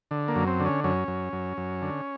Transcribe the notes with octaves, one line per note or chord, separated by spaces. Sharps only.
D3
A#3
F#2
C4
D3
C#4
F#2 C#4
F#2
F#2
F#2
D3